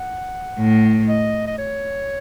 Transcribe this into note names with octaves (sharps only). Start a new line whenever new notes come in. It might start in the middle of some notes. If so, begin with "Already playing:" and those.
Already playing: F#5
A2
D#5
D#5
C#5